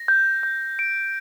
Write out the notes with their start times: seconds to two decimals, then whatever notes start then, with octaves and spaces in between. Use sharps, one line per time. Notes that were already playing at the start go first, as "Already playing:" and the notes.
Already playing: A#6
0.08 G6
0.43 G6
0.79 D7